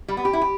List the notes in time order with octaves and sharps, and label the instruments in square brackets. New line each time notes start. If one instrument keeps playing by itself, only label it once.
[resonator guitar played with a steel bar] G3
B3
G4
E4
G4